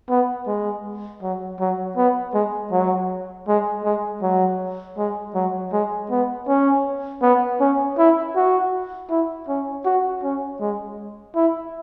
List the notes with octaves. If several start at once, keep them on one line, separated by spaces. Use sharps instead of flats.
B3
G#3
F#3
F#3
B3
G#3
F#3
G#3
G#3
F#3
G#3
F#3
G#3
B3
C#4
B3
C#4
E4
F#4
E4
C#4
F#4
C#4
G#3
E4